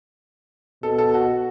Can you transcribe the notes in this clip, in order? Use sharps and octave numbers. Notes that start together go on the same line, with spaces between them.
B2 A4
A4
F#4